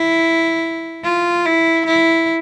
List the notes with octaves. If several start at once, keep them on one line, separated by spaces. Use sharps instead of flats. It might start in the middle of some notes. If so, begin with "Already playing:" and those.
Already playing: E4
F4
E4
E4